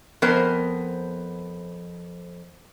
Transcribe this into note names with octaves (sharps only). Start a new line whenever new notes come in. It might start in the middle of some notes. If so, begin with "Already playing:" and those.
F2 B3 A#4 C5